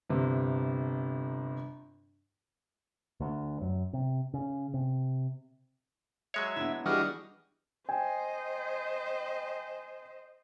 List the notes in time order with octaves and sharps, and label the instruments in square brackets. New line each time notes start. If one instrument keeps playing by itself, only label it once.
[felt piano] G1 C3
[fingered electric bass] D2
F#2
C3
C#3
C3
[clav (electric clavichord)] F#3 G#3 C#5 [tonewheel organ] E5
[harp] B3 D4 E4
[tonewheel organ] E3 [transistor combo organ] G3 F#4 D#5 [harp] G#4 F6
[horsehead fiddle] C5 D#5 [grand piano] G5 G#5